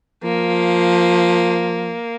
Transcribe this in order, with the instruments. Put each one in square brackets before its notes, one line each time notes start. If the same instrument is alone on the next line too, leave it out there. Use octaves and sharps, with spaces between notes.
[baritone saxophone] F3 [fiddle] A#3